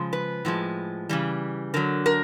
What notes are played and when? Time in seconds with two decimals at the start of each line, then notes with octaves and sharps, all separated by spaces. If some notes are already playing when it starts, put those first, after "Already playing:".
Already playing: C#3 F3 G#3
0.13 B4
0.45 A2 F3 G#3
1.09 C#3 E3 G3
1.74 D3 F#3 A#4
2.06 A#4